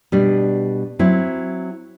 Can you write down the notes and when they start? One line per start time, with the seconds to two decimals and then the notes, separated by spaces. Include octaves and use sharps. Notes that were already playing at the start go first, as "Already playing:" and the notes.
0.12 B2 G3 D4
0.99 F#3 C4 E4